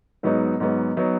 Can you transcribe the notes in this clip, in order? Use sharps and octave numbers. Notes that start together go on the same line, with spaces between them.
G#2 F#3 B3 D#4
G#2 F#3 B3 D#4
F#3 B3 D#4